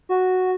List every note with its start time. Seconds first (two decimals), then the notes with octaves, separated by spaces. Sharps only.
0.09 F#4